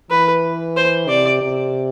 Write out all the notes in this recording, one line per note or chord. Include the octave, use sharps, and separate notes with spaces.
E3 B4
C5
C3 D5
C3